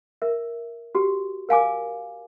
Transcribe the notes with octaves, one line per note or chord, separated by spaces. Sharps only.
A#4 E5
F#4 G4
A#4 F5 G#5 D6